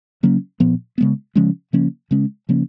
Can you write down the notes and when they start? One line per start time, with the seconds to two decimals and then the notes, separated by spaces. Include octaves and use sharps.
0.23 C#3 F#3 A#3 C#4
0.60 A#2 F3 B3
0.98 C#3 G#3 B3
1.35 C#3 F3 G#3 C#4
1.73 C#3 F3 A#3 C#4
2.11 C#3 G#3 C#4
2.49 C#3 F3 A#3 C#4